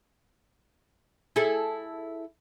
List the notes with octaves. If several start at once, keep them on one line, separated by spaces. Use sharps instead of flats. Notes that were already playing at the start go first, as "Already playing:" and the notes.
E4 G#4 A4